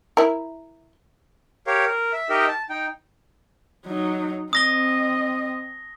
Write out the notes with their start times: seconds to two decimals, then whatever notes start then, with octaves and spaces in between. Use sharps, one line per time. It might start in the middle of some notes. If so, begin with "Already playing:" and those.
0.17 E4 A#4
1.67 G4 A#4 C#5 F5
1.85 A#4
2.13 E5
2.29 D#4 G4 A#4 D#5 E5
2.48 A5
2.69 D#4 G5
3.86 F#3 D#4
4.53 C4 D#5 D#6 A#6 G7